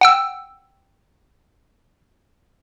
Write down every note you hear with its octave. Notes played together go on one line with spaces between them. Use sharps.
F#5 G5 E6